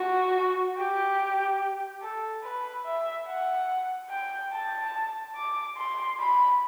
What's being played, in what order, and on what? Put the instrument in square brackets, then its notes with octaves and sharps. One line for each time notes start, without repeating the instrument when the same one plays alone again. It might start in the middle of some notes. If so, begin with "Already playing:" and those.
Already playing: [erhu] F#4
G4
A4
B4
E5
F#5
G5
A5
D6
C6
B5